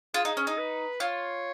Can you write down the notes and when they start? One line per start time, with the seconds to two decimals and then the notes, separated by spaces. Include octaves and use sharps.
0.14 F4 G#4
0.25 D#4
0.37 C#4
0.47 D#4
0.58 B4
1.00 F4 C#5